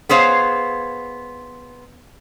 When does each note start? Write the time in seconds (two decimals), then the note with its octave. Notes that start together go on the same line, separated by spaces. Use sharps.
0.09 B3 G#4 C5 C#5 F5